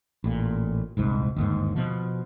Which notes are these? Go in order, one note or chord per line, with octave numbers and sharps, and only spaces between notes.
A1 A#2
D#1 C2 G#2
G1 D#2 G#2
B2 F3